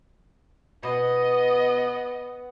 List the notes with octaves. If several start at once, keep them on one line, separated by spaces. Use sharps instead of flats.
B2 B3 D#5